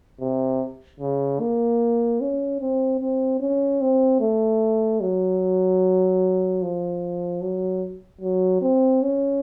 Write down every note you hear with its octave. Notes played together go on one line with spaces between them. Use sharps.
C3
C#3
A#3
C#4
C4
C4
C#4
C4
A3
F#3
F3
F#3
F#3
C4
C#4